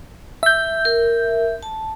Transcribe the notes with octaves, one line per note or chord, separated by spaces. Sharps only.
E5 G6
A#4
A5